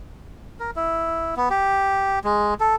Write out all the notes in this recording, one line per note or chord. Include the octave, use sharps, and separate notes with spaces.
A#4
E4
B3
G4
G#3
A4